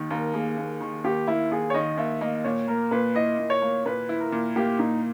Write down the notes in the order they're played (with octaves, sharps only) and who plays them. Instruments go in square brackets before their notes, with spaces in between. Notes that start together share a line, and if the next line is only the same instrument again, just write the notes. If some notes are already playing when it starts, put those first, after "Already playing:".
Already playing: [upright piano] D#2 D#3
[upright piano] D#2 [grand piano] A#4
[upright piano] A#3 [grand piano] G#4
[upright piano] D#2
D#3
[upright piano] D#2 [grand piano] G4
[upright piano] A#3 [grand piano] E4
[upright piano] D#2 [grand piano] G#4
[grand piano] C#5
[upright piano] D#3 [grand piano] D#5
[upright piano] D#2 [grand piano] E5
[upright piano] A#3 [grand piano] D#5
[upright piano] A#2 [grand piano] C#5
[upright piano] A#3 [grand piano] A#4
[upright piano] A#2 [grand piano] B4
[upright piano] E4 [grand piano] D#5
[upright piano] A#2
[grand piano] C#5
[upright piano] A#3
[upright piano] A#2 [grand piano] B4
[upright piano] E4
[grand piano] A#4
[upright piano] A#2
[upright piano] A#3 [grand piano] G4
[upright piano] A#2 [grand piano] D#4